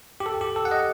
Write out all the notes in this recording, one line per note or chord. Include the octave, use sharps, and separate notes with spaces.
G4
A4
G4
A4
F#5
D#5